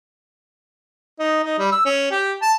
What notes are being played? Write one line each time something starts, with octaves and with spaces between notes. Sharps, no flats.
D#4
D#4
G3
E6
C#4
G4
A5